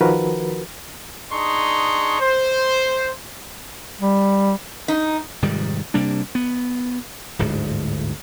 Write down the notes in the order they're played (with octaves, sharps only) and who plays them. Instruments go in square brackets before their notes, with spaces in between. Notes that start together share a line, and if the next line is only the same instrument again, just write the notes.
[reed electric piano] D#3 F3 F#4 A#4 B4
[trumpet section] D4 D#4 G#4 C6 C#6
C5
[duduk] G3
[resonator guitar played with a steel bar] D#4
[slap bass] F1 G#2 D#3 G3
C3 G3 A#3 D4
B3
D1 G1 D2 G#2